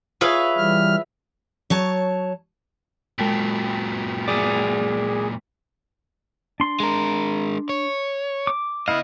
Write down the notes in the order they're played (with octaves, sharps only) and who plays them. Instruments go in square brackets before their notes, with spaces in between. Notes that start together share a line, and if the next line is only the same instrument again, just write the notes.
[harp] F4 G#4 C#5 [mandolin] B4 E5 F5
[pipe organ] E3 G3 F6
[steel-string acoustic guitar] F#3 C#5 A5
[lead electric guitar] A#2 F#3 [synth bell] G#3 G5 B6
[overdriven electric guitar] G#4 D5
[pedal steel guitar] D4 C6
[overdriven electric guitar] G#3 A#4
C#5
[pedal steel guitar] D6
[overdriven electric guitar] C#3 D#5 [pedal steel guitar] B3 E4 F5